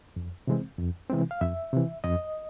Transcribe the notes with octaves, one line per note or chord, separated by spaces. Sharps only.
F2
C3 E3 G#3 C4
F2
C3 E3 G#3 C4
F5
F2 E5
C3 E3
F2 D#5